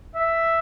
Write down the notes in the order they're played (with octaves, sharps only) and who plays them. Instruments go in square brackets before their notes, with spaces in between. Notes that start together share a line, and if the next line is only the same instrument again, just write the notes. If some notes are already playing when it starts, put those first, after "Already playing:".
[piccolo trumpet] E5